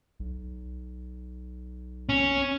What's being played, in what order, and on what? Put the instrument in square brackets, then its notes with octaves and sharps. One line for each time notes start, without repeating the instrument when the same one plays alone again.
[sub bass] B1
[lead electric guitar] C#4